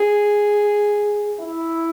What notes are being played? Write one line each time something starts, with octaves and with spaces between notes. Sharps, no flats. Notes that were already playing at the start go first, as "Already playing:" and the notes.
Already playing: G#4
E4